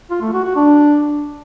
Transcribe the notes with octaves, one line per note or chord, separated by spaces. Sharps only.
F4
A3
F#4
F#4
D4